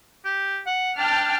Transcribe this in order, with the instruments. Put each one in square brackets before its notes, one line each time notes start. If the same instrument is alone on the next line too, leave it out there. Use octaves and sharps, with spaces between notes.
[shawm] G4
F#5
[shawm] D4 [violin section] G5 A5 F6